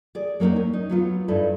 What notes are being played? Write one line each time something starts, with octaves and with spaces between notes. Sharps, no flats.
G#4 D5
F#3 A#3 B3 C#4 D#4
C#4
D#4
F#3 B3 F4
G2 D#4 E4 A4